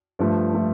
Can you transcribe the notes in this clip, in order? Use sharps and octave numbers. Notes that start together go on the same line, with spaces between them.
G2 F3 A3
F3 A3